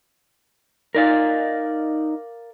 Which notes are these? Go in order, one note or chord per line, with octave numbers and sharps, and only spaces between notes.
D#4 A#4 D5 F5